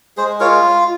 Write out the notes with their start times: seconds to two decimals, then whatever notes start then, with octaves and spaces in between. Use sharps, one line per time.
0.17 G#3 G#4 C5
0.40 F4 A#4 C#5